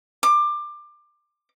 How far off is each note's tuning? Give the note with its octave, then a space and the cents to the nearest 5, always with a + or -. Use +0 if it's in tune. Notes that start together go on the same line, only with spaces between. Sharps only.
D6 +20